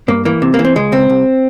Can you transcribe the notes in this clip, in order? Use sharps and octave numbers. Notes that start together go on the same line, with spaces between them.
G2 A#3
E3 A#3
C3
A#3
E3
C4
C#2 G#3
C#2 C4
C2